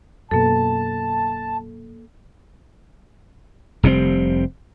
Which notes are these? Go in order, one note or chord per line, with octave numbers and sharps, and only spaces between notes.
F#2 B2 A#3 A4 A5
F1 C3 G3 C4